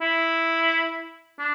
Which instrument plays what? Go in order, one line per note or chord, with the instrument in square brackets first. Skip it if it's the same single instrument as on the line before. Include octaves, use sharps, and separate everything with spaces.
[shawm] E4
D4